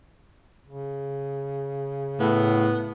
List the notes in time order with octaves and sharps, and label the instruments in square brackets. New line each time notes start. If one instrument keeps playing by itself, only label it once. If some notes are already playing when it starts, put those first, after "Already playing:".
[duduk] C#3
[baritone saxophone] A2 [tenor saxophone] B3